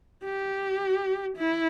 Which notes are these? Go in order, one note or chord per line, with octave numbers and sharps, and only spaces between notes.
G4
E4